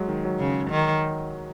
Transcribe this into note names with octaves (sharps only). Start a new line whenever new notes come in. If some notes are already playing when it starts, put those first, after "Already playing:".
Already playing: F#3 G#3
D#3
F#3
C#3
D#3